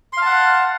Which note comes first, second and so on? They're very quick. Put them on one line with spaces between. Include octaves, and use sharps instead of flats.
C6 F5 A5 F#5